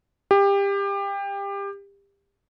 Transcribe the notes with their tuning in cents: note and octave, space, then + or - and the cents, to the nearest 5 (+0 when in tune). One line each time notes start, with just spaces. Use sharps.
G4 +25